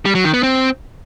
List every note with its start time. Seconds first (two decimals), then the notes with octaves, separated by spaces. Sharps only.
0.05 G3
0.15 F#3
0.24 D#3
0.34 B3
0.43 C4